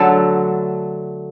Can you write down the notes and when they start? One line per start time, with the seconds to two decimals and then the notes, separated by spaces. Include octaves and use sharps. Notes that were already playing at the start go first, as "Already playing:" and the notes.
Already playing: D3 F#3 A3 A4